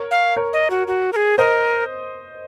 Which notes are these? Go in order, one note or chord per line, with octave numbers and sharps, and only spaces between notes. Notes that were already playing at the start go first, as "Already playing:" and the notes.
Already playing: A#4 C#5
F5
A#4 C#5
D#5
F#4
F#4
A#4
G#4
A#4 C5 D#5